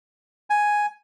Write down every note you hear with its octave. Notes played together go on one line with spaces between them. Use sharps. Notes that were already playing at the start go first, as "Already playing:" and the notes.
G#5